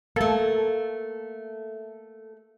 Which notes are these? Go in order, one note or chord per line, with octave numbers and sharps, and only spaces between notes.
A3 A#3 A4